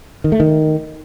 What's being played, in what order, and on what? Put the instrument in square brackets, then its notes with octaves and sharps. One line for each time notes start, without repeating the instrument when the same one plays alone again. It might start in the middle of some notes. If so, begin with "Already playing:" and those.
[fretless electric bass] D#3
A3
D#3